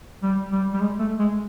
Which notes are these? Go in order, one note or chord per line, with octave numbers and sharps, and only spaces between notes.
G3
G3
G3
G#3
A3
G#3